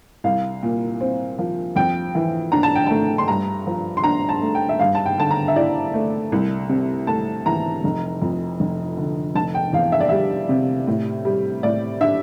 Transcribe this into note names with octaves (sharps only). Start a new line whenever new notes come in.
C2 F5
A#2
C4
F3
F2 G5
E3
D4 A#5
A5
G5
A3 A5
C6
G2 A#5
F3
C6
D4 A#5
A5
A3
G5
E5
G2 F5
A5
G5
D3 A5
A#5
E5
E4 D5
A3
C2
C3
A3 A5
E3 A#5
F1
F2
F1
D3
F1 A5
G5
E2 F5
E5
D5
G3 E5
C3
A2
G3
A2 D5
D4 E5